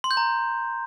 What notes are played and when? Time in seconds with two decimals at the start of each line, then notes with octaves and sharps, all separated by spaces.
0.04 C6
0.11 G6
0.17 A#5